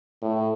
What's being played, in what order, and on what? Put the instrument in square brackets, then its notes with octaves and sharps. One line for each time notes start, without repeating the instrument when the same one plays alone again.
[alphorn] A2